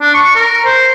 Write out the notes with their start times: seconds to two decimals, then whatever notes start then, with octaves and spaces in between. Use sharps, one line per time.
0.01 D4
0.14 C#6
0.35 A#4
0.65 C5